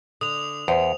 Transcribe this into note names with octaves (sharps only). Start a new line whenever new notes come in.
D3 D#6 F7
E2 C5